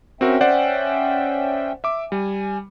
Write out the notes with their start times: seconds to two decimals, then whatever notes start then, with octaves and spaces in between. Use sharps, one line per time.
0.21 C4 C#4 F#4 A#4 E5 G5
0.41 C5 D5 F#5
1.84 E5 D6
2.12 G3 G#5